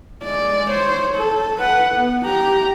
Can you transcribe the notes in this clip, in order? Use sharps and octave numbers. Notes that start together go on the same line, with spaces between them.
G#3 D5
C5 C#5
A4
B4 F#5
B3
G4 A#5